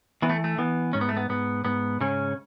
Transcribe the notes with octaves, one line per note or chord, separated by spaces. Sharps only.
E3 B3
A3
A3
E3 B3
G#2 C#4
B3
A3
B3
G#2 B3
G#2 B3
G#2 C#3 C#4